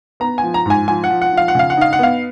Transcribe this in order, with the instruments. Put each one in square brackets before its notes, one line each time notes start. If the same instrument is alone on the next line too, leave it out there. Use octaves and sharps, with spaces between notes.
[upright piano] B3 A#5
G#5
F3
A#5
G#2 G#5
F3 G#5
F#5
F3
F#5
F3 F5
F#5
C#3 F5
F#5
D#4 F5
F#5
B3 F5